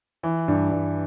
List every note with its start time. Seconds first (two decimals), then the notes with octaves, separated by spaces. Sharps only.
0.23 E3
0.48 G2
0.71 G2